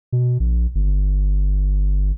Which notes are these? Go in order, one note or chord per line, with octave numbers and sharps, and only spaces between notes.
B2
A#1
G1